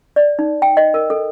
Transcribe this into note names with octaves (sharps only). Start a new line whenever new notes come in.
D5
D#4
G5
D#5
A#4
A4